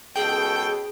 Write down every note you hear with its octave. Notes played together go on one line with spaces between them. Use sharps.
C#2 B2 G#4 A4 G5